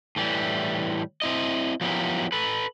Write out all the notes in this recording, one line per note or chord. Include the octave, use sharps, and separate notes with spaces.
A2 E3 G3
C4 E4 D#5
F3 F#3 B3 E4 G4 A#4
A4 B4